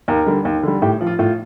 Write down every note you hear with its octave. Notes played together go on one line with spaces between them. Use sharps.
D#2 A#4
D3 G3
D#2
D3 G3
A2 G4
F3
F4
A2 F4